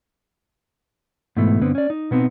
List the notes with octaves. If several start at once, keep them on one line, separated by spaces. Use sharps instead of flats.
G#2 B2 E3 A3
G2 D3 B3 C4
C#4 D5
D#4
B2 B3 C4 D#4